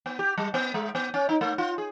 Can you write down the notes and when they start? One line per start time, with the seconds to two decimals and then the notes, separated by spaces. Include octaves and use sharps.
0.06 B3
0.19 G4
0.38 G3
0.54 B3
0.74 G#3
0.95 B3
1.14 C#4
1.29 D#4
1.41 A3
1.58 F4
1.78 G#4